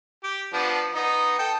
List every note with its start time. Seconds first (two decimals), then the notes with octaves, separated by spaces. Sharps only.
0.24 G4
0.53 F3 B3 D4
0.95 B3 D#4
1.39 A4 G5